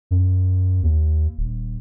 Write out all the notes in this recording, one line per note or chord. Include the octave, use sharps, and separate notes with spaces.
F#2
D#2
D#1